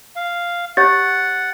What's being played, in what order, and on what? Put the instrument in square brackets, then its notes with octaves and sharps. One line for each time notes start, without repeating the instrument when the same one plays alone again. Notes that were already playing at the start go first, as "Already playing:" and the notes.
[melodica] F5
[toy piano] G4 C#5 [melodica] F#5 [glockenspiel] A6